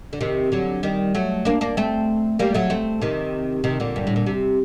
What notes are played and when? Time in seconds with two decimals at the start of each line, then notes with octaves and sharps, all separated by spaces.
0.13 D3
0.21 C3 D#3
0.52 D3 F#3
0.83 D#3 G3
1.15 F#3 A3
1.45 A#3 D4
1.61 A#3 D4
1.77 A3 C4
2.39 G3 A#3
2.54 F#3 A3
2.70 A3 C4
3.02 C3 D#3
3.64 C3 D#3
3.80 A#2 D3
3.96 G2
4.07 A2
4.16 A#2
4.26 C3